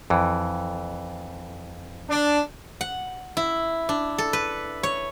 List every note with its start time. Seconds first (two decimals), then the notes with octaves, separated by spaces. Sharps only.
0.10 F2 E3
2.10 D4
2.81 F#5
3.37 E4
3.89 D4
4.18 A4
4.33 B4
4.83 C#5